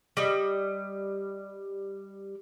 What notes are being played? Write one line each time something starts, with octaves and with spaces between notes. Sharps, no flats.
G3 D#5